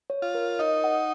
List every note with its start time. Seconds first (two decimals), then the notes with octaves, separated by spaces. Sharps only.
0.10 C#5
0.22 F4
0.35 A#4
0.59 D#4 D#5
0.84 F#5